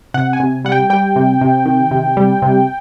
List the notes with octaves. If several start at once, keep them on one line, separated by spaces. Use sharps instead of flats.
C3 F#5
G#5
C3
G3 F#5
G5
G3 G5
C3
C3
D#3
C3
G3
C3